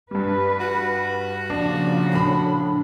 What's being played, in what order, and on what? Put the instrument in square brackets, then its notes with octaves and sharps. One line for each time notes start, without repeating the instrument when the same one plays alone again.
[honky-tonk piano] G2 G3 [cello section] B4
[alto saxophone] F#4
[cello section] A#2 C#3 F3 [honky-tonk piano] D4
[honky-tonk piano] A2 B5 [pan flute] D4